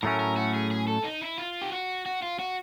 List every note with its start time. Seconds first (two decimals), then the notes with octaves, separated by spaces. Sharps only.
0.02 A2 F#3 A3 C#4 A#4
0.20 A#4
0.36 F#4
0.54 G#4
0.71 G#4
0.87 A4
1.04 D#4
1.21 E4
1.38 F4
1.62 G4
1.72 F#4
2.06 F#4
2.22 F4
2.39 F#4